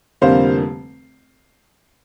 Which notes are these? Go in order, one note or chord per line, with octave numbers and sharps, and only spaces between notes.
F1 F2 D3 G3 A#3 C5 F5